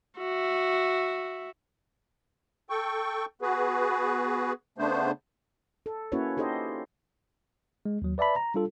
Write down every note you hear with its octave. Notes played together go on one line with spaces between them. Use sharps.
F#4 E5
A4 G5 C#6
B3 F#4 G#4 B4
C#3 A3 B3 D4 C5
A4
A#3 C#4 E4 F#4 B4 C#5
D#4 G4 A4 C5 D#5
G#3
D#2 F#3
B4 D5 E5 A5 B5
A#5
G3 D4 F4 A4